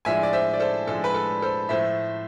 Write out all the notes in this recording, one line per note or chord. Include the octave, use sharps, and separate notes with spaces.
A2 F3 G#3 D4 E5 G#5
D5
C5 E5
D5
A4 C5
A2 F3 G#3 D4 A4
B4
A4
A4 C5
A2 F3 A3 C5 E5